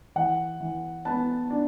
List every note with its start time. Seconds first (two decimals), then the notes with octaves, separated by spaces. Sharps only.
0.16 E3 F#5
0.60 E3
1.05 B3 A5
1.50 D4